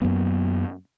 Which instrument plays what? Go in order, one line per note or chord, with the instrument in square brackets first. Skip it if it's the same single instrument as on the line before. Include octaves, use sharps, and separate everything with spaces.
[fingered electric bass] F#2 F#3 A#3 B3